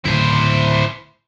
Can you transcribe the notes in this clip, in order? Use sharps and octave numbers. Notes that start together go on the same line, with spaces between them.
D1 C#3 E4 C5